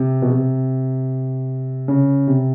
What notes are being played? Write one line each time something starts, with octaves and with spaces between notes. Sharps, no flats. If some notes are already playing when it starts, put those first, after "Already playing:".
Already playing: C3
B2
C3
C#3
C3